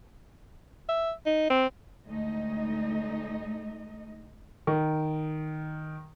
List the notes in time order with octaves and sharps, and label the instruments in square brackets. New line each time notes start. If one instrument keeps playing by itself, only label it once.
[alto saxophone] E5
D#4
C4
[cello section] D2 A2 G#3 A3 D#4 D#5
[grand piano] D#3